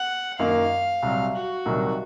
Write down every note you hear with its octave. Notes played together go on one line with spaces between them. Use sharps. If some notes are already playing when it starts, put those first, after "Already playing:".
Already playing: F#5
F#2 D#3 A#3 F5
C2 C3 F#3
F#4
C2 C3 D#3 F#3